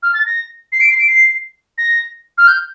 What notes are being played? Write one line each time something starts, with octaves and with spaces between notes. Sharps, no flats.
F6
A6
A#6
C7
D7
C7
D7
C7
A#6
F6
G6